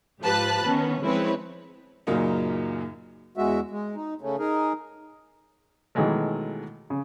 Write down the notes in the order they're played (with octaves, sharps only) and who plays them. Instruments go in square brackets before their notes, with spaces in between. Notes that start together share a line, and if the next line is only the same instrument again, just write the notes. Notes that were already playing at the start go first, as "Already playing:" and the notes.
[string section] G#2 F3 G4 B4 A5 F#6
D#3 B3 C#4
F3 G#3 C4 E4 B4 C#5
[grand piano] F#2 A#2 C#3 F#3 A#3 D#4
[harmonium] E2 G#3 F#4 E5
G#3
D#4
C#3 A3 C#4
D#4 G#4 A#4
[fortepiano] B2 D#3 E3 F#3 G#3 A3
C#3